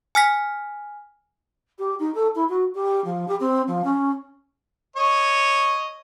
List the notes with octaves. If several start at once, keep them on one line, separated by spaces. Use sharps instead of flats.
G#5 F6 B6
G4
D#4
A4
E4
F#4
G4
F3
G4
C4
F3
C#4
C#5 D#5